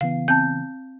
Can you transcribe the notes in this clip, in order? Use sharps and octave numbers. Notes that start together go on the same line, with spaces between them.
C#3 E3 B3 F5
C4 A5 G6